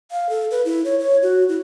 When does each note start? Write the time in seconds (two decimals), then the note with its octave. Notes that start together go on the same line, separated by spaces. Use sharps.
0.11 F5
0.29 A4
0.51 B4
0.65 E4
0.85 C#5
0.99 C#5
1.23 F#4
1.49 E4